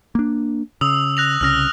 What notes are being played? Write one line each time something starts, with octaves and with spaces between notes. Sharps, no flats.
A#3 D4
C#3 D#6 E6 F7
F#6 A#6 F7
C2 C#3 E6 F6 A#6